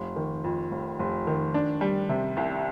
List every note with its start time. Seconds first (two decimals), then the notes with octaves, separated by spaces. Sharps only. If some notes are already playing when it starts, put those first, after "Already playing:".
Already playing: F1
0.16 D#3
0.44 F2
0.71 F1
0.99 F1
1.27 D#3
1.54 D4
1.81 G3
2.09 C3
2.37 C2